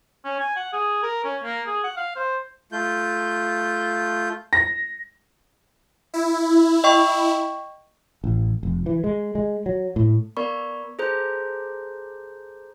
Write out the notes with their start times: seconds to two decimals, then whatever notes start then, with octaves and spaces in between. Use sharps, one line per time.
0.25 C#4
0.40 G#5
0.56 F#5
0.73 G#4
1.03 A#4
1.24 C#4
1.43 A#3
1.67 G#4
1.84 F#5
1.97 F5
2.16 C5
2.72 A3 F4 G6
4.53 A#6
6.14 E4
6.84 D#5 G5 C#6
8.24 A1
8.63 F1
8.86 E3
9.04 G#3
9.35 G#3
9.66 F#3
9.96 A2
10.37 B3 A#4 D5 B5 C#6
10.99 G#4 A4 C5 A#5 G6